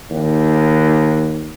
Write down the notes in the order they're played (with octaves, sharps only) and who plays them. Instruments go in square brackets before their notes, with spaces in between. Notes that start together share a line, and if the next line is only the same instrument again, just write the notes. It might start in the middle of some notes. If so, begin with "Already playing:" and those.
[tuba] D#2